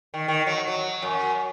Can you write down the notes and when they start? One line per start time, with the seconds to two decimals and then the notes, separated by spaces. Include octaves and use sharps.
0.14 D#3
0.28 D#3
0.47 F#3
0.68 F#3
1.02 F#2